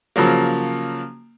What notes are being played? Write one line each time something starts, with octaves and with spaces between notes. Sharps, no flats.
C#3 F3 F#3 A#3